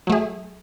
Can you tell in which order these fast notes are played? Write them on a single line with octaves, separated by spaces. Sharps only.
F#3 A3 G#4